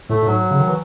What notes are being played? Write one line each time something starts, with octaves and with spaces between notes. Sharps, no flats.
A2 A3
A2
G#2 F#3
C#3
D#3
E3